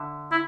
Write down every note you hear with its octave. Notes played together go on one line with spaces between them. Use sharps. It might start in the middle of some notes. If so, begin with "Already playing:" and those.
Already playing: D3 E5
E4